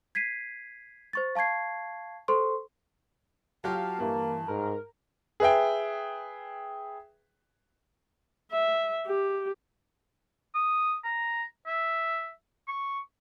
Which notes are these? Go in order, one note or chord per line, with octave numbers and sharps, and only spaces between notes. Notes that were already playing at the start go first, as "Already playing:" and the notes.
G#6 B6 C7 D#7
C5 C#6 A6
F5 A5 C#6 G#6 C7
A4 C5 C6 C#6
F#3 F4 G4 F5 A5
G2 E3 A#3
G#2 A#4
G#4 B4 E5 G5
E5
G4
D#6
A#5
E5
C#6